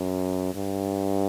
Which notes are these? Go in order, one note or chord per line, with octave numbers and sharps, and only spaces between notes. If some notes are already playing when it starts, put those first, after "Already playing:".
Already playing: F#2
G2